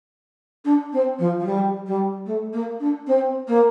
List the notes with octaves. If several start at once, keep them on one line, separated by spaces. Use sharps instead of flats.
D4
C4
F3
F3
G3
G3
A3
A#3
D4
C4
A#3